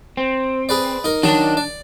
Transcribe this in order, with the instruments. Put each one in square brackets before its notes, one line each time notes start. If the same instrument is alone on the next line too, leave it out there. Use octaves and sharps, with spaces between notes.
[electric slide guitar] C4
[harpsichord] G#4 B4 D5
D#4 A#4
[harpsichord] D#3 F#3 D#4 [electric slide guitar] D4 A5
[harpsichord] D5